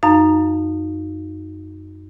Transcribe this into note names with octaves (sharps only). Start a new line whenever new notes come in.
F#2 D#4 F5 A#5